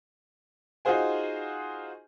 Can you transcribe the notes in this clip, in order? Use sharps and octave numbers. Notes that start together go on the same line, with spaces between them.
D#4 F4 F#4 G#4 C5 G#5